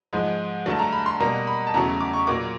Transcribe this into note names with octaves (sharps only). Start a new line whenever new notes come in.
G#2 F3 G#3
G2 D3 F#3 A3 A5
A#5
B5
C6
B2 G3 A#3 A#5
B5
A5
E2 C#3 F#3 A3 A#5
D6
C#6
A#2 F#3 A#3 D6